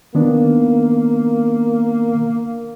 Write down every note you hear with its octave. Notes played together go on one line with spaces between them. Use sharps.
D#3 A#3 B3 D4